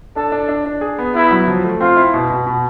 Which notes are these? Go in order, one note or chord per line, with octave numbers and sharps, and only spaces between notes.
D4 A4
D4
D4
D4
G#4
B3
B3 E4
F#3
F3
A3
C4 F4
E4
B2
B2
B2